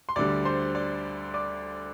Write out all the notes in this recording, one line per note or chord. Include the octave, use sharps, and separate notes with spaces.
C6
D2 D3 G3 D5 D6
C5 C6
D5 D6
D5 D6